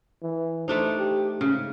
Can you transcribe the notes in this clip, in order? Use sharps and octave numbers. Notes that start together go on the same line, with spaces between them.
E3
A3 D4 D#4 C5
G4
G#2 C#3